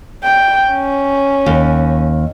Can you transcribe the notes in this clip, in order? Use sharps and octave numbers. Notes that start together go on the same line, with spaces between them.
G5
C#4
D#2